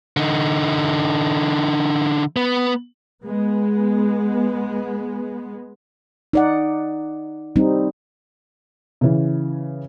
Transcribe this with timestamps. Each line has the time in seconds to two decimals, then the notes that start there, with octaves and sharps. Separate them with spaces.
0.17 D3 D#4
2.36 B3
3.24 G#3 B3
6.33 D#4 D5 F#5
7.56 G3 C4 D#4
9.01 C#3 E3